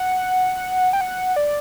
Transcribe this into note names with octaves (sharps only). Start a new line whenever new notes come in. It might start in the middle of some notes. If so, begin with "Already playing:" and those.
Already playing: F#5
G5
F#5
D5